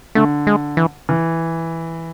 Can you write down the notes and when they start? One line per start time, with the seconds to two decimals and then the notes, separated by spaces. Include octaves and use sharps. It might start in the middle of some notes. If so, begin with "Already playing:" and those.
0.15 D3 A3
0.47 G#3
0.77 E3
1.09 E3